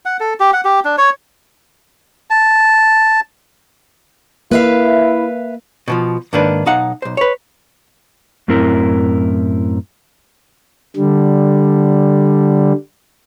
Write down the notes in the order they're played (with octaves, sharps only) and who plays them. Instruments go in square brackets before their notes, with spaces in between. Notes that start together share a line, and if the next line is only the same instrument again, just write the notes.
[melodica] F#5
A4
G4
F#5
G4
D4
C#5
A5
[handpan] A#3 [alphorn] E4 [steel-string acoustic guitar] B4 E5 F5
[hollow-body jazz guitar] B2 E3 F3
G#2 D#3 A#3 D4 B4
B1 D#4 F5 F#5
B1 C5
B4 C#5
[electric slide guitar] F#2 A2 C4 E4 A#4
[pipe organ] D3 G3